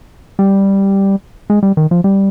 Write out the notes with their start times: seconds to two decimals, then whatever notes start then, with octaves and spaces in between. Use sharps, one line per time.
0.39 G3
1.50 G#3
1.63 G3
1.77 D#3
1.91 F3
2.04 G3